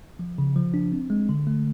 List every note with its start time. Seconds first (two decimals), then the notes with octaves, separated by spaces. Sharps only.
0.19 F3
0.38 C#3
0.56 F3
0.74 D4
0.92 C4
1.10 G#3
1.29 D3
1.47 A3